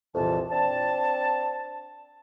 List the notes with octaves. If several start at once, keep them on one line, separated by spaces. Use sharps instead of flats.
C2 F2 A#2 E3 A5
C4 D4 A5